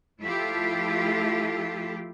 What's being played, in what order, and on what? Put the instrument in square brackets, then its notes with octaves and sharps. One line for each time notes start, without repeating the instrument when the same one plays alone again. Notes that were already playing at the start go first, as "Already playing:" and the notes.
[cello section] F3 A3 E4 F4 G4 A4